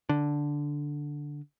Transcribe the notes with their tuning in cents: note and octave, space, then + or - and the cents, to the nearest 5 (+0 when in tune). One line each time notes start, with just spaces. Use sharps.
D3 -5